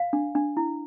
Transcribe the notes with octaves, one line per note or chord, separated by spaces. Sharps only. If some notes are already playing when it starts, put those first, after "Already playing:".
Already playing: F5
D4
D4
E4